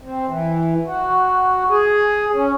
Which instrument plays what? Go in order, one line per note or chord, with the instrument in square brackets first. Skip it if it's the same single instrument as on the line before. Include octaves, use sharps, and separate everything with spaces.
[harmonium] C4
E3
F#4
G#4
C#4